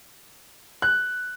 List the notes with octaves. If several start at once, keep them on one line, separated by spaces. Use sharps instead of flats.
F#6